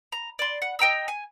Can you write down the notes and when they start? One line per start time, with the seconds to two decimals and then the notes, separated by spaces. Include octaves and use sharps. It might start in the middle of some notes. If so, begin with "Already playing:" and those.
0.12 A#5
0.39 D5 C6
0.62 F#5
0.79 D#5 G5 A#5 E6
1.08 G#5